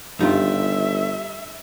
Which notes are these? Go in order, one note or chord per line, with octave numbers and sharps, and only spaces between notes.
G1 G2 C#3 G3 D#4 F4 G4 E5